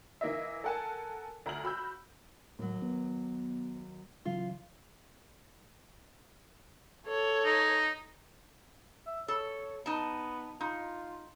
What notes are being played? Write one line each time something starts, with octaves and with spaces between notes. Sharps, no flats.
E3 A#3 D#5 E5
A4 A#4 F#5 G#5 A5
D2 A#5 F6 F#7
F#4 B5 E6 G6
D#2 A2 F#3
B3
C#3 E3 F#3 F4
A4 C#5
D#4
E5
A4 C#5
B3 D#4 A5
D#4 F4